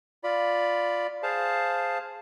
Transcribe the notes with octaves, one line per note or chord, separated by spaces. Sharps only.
F4 D5 B5
G#4 C5 F5 A5